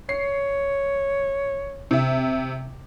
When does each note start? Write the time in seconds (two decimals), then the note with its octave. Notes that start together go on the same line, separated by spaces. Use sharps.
0.09 C#5 C7
1.91 C3 E5